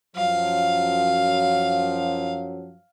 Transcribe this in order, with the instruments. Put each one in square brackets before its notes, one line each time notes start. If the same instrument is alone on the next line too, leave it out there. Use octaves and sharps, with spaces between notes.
[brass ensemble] F#2 F3 F#3 [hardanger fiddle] F5